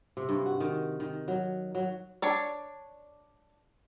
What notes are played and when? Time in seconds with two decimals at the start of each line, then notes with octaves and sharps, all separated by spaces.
0.17 C3
0.29 G2
0.46 F#4
0.60 D#3
1.00 D#3
1.28 F#3
1.75 F#3
2.22 D4 C#5 D5